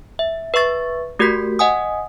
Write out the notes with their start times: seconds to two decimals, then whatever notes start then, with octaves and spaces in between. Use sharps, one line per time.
0.19 E5
0.54 B4 E5 C#6 A6
1.19 A3 F#4 G4 A#4 G6 B6
1.59 D#5 F#5 G#5 D#6